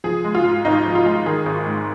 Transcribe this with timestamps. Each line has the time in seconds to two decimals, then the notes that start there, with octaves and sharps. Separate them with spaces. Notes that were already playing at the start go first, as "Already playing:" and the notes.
0.04 F3 G#4
0.24 G#3
0.35 F4
0.45 G#2
0.65 G#1 D#4
0.85 F3
0.95 F4
1.06 G#3
1.26 D#3 G#4
1.46 G#1
1.67 G#2